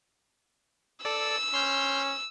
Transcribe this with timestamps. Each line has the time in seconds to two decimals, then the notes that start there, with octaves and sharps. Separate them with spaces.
1.05 A4 D5 E6
1.54 C#4 C6 F6 G6